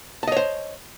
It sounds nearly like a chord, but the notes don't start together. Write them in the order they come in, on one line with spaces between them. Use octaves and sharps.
A5 D#5 C#5 C5